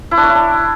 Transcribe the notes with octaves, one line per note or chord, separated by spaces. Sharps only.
E4
D4
C#5
E4
D4